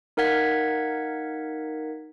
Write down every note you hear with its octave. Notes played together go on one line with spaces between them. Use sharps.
D#4 A#4 F5 F#5 G#6 B6